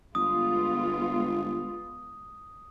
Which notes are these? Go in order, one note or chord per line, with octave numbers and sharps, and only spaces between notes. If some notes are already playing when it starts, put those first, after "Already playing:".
G1 G#3 B3 F4 D#6